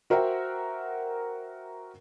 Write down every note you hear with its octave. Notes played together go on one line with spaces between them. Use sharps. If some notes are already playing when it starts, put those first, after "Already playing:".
F#4 A#4 C5 E5 F#5 G5